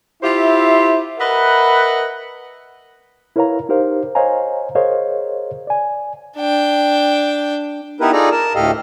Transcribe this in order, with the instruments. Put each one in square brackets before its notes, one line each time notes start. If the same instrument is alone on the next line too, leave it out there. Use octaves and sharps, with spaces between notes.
[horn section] E4 F4 G4 C5 E5
A#4 B4 D#5 E5 F#5 B5
[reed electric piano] E4 A#4 B4 C#5 F5 A#5
D#4 G4 A#4 C5 F5
C5 C#5 D#5 F5 G#5 A#5
G#4 A#4 C5 C#5 D#5 F5
D5 G#5
[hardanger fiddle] D4 G5
[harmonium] B3 D#4 E4 G4 A#4 B4
D#4 F4 G#4 A4 D5 A#5
A#4 A5
D2 A2 G4 A4 D#5 F5